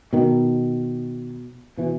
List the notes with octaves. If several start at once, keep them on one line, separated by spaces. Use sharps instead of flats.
B2 D#3
B2 E3